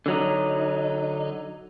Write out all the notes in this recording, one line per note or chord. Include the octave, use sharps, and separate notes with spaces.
D3 F#3 D#4